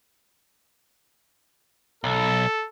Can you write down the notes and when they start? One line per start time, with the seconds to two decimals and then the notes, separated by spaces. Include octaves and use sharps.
2.04 B1 A4